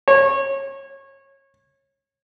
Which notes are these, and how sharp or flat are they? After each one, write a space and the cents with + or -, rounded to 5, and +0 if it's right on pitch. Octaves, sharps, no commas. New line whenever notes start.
C#5 -25